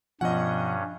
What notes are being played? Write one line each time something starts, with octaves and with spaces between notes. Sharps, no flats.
G2 B2 F3 C#4 D#5 F#5